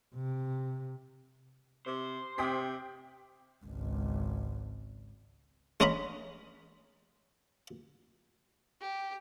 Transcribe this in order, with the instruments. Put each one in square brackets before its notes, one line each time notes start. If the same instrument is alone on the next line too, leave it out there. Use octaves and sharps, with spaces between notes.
[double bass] C3
[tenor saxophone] C3 [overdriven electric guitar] C5
[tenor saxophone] C3 [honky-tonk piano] G5 D#6 B6
[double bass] G#1 C#2
[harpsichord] G#3 C#4 D#5 A#5 B5
[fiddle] G4